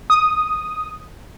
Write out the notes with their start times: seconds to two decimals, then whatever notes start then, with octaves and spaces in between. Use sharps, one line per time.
0.10 D#6